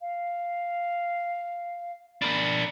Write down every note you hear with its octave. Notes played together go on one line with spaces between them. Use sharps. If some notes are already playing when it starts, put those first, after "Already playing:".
F5
D4 A#4 B5